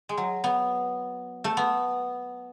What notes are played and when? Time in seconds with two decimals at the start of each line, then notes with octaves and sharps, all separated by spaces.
0.09 G#3
0.18 F#3
0.44 B3
1.44 A3
1.57 B3